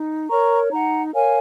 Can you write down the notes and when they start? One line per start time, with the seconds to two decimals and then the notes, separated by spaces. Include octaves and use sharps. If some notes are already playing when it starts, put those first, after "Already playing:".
Already playing: D#4
0.30 A#4 C#5 A#5 C#6
0.72 D#4 F#5 A#5
1.14 A#4 C#5 F5 G#5